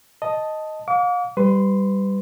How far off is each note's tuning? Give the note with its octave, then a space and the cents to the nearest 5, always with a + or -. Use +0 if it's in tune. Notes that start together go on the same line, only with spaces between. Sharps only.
D#5 +0 A5 +0
F5 +40 D6 -40
G3 +0 B4 +25 C6 +0